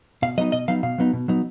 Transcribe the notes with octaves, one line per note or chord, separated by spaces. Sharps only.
B2 F5
F#3 B3 D#4 D#5
B2 D#5
F#3 B3 D#4 F5
B2 F5
F#3 B3 D#4
B2
F#3 B3 D#4